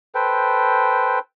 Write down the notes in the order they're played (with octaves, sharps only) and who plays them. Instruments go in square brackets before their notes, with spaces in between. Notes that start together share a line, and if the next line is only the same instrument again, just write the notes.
[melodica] A4 B4 C5 G5